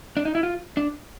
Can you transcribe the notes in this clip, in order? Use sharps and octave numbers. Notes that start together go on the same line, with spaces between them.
D4
D#4
E4
F4
D4